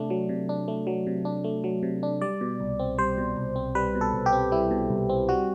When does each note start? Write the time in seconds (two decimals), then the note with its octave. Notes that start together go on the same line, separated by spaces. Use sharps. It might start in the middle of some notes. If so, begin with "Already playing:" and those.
Already playing: C3 A3 D4
0.10 F#3
0.29 C3
0.49 D4
0.68 A3
0.87 F#3
1.07 C3
1.25 D4
1.44 A3
1.64 F#3
1.83 C3
2.03 D4
2.21 G3 D5
2.41 B2
2.60 C2
2.79 C4
2.98 G3 C5
3.18 B2
3.37 C2
3.56 C4
3.75 G3 B4
3.95 B2
4.01 A4
4.14 C2
4.26 G4
4.33 C4
4.52 G3 E4
4.71 B2
4.90 C2
5.09 C4
5.29 G3 F#4